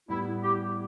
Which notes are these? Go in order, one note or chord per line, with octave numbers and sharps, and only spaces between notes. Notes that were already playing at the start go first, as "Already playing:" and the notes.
A2 G3 B3 E4
G4